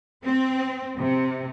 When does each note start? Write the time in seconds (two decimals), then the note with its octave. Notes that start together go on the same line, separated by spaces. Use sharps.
0.24 C4
0.98 C3